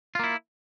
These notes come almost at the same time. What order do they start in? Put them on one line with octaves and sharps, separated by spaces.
F4 A#3 E4